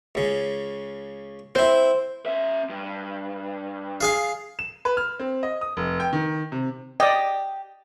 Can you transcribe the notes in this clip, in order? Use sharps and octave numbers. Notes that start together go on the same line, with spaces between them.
C#2 C#3
C4 E4 C5
C#4 E5
G2
F4 G#4 F5
E7
B4
F6
C4
D#5
D#6
F1
G5
D#3
C3
G4 D5 D#5